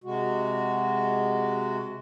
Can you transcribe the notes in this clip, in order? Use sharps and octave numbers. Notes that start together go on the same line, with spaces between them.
C3 G#3 F#4